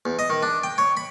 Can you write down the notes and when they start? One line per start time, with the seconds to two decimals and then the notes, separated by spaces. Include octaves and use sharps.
0.06 E2
0.19 D#5
0.30 D#3
0.42 D4
0.63 G5
0.78 C#5
0.97 B5